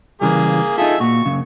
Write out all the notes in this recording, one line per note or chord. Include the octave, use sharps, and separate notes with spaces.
C#3 E3 G3 A#3 G#4
D#4 F4 G#4 A4 E5
A#2 F#4 C#6
F#2 C#3